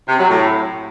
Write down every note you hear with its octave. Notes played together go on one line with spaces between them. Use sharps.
C3
F#3
A2